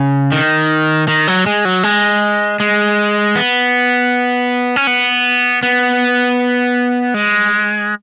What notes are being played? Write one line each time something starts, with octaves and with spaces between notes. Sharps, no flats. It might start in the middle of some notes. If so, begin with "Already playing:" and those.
Already playing: C#3
D#3
D#3
F#3
G#3
F#3
G#3
G#3
B3
C#4
B3
B3
G#3